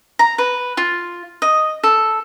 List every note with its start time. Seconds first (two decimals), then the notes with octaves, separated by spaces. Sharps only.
0.19 A#5
0.38 B4
0.77 F4
1.42 D#5
1.83 A4